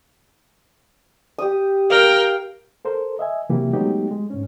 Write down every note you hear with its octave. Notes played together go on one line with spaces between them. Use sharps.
G4 D#6
A#4 F5 G5
A4 A#4 C5
D#5 E5 G#5
C3 E3 F#3 A#3 E4 G4
F#3 G#3 A3 B3 D#4 G4
G#3
G#2 C#4